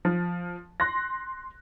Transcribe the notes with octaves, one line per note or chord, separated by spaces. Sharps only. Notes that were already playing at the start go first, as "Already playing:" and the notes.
F3
C6 F#6 A#6